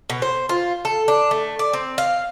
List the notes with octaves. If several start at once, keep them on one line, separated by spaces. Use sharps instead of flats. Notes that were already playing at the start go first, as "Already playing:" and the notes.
B2
C5
F4
A4
D4
A3
D5
C4
F5